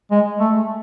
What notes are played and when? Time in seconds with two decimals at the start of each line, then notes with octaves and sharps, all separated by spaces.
0.11 G#3
0.40 A3